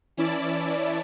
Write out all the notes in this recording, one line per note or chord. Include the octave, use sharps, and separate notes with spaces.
E3 C#4 E4 D5 A5